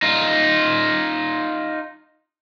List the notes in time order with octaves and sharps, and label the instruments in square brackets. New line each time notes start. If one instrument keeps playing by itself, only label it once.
[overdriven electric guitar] D#4 F4